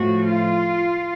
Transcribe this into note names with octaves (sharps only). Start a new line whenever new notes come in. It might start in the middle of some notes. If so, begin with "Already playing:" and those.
Already playing: A2 F3 F#4
F4